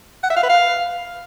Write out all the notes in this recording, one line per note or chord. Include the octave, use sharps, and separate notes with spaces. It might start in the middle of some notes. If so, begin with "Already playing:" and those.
F#5
E5
F5
B4
F5